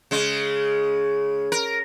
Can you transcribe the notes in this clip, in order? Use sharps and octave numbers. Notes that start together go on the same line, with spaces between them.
C#3 G#3
A#4